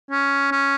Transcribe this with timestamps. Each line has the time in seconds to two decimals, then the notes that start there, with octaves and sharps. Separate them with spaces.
0.11 C#4
0.51 C#4